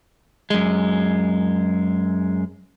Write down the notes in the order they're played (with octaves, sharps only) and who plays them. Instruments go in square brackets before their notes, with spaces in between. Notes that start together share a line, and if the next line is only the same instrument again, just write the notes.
[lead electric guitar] F#2 G#3